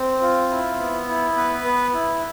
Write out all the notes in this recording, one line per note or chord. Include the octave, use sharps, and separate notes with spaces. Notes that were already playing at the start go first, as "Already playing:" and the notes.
Already playing: C4
F4
E4
B3
E4
B3 B4
B3
E4